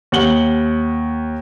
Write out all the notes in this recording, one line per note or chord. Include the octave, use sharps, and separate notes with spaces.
D#2 F#5 F#7 G7